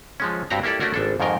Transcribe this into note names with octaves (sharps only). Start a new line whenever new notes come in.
F3 G#3 C#4
G2 C4 F#4 G4 A#5
A#3 E4 G4 A4 D5
A3 C#4 D4 F#4 A#4
G#1 D4 A4
F2 G#2 D#3 A#4 G5